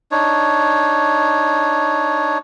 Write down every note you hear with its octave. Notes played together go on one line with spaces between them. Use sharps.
D4 D#4 C#5